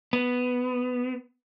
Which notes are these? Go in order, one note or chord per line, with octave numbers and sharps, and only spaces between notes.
B3